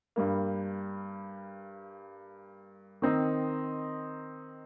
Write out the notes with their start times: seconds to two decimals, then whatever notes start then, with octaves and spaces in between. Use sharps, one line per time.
0.16 G2 G3 A#3
3.02 D#3 C4 D#4